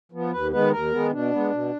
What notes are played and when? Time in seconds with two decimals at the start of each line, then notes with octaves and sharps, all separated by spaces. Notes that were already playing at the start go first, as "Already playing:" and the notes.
0.12 F3 B3
0.32 D#2 B4
0.51 D#3 G#3 B3 B4
0.71 D#2 A#4
0.91 D#3 G#3 B3
1.11 B2 D4
1.31 G#3 B3
1.51 B2